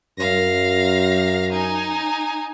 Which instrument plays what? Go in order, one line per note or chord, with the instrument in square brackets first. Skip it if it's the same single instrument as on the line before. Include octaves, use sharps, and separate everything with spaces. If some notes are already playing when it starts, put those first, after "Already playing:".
[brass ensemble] F#2 [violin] F5 A#6
[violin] D#4 G#5